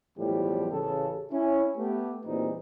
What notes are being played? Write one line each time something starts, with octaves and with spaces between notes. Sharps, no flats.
B1 E2 A2 F3 G3 G4
A1 C#3 A4
C#4 E4
A3 B3 G4
E2 A#2 E3 G3 C4 D#4